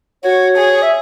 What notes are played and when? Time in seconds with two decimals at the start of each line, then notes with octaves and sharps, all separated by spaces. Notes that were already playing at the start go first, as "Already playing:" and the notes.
0.24 F#4 C#5
0.58 G#4
0.82 E5